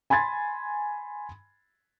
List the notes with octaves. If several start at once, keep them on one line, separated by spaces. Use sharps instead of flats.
G#5 B5 C6 G#6 A6